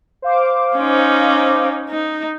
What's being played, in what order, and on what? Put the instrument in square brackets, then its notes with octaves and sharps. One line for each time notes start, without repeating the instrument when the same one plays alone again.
[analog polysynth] C5 F5 D6
[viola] C#4 D#4
D#4